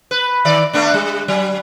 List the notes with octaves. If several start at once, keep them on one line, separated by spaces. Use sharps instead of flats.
B4
D#3 D5
A3 B3 D4
G3
F#3